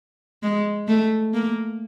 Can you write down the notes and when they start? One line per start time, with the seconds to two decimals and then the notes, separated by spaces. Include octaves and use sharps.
0.43 G#3
0.88 A3
1.34 A#3